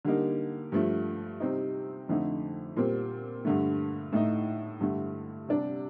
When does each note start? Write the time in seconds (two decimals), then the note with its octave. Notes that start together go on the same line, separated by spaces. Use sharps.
0.05 D3 G3 A#3 D#4
0.72 G2 F3 A3
1.40 C3 G3 C4 D#4
2.09 F2 D3 A3 D#4
2.77 A#2 G3 C4
3.45 G2 D3 A3
4.12 A2 A3 D#4
4.80 G2 D3 A3
5.48 C3 G3 D4